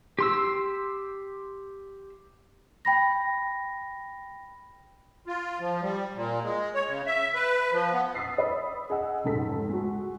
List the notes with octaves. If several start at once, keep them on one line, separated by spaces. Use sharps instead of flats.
G4 C6 E6
G5 B5 A#6
F4
F3
G3
A#2
G#3
C#5
C#3
E5
B4
F3
B3
D#6 E6 A6 B6 C7
D5 B5 D#6
G#4 D#5 F#5 E6
F1 C#2 G#2 A4 B6
G#3 F#4